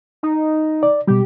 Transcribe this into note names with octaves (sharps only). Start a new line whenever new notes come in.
D#4
D5
B2 G3 G4